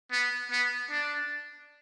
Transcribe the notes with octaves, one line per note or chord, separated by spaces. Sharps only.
B3
B3
D4